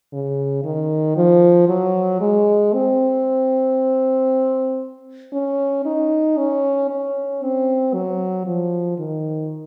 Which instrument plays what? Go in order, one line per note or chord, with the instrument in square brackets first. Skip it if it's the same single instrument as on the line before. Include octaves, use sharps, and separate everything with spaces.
[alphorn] C#3
D#3
F3
F#3
G#3
C4
C#4
D#4
C#4
C#4
C4
F#3
F3
D#3